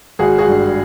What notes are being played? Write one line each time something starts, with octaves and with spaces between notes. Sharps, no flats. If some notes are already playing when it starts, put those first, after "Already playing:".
G#1 F#4 G#4
F#4 G#4
G2